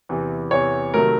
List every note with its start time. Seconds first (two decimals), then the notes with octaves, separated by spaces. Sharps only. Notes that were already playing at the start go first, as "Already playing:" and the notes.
0.09 E2 C3 E3
0.51 E2 C3 E3 C#5
0.94 C3 D#3 F#3 A3 A#4